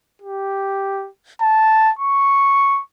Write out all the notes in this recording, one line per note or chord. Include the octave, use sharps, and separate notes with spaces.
G4
A5
C#6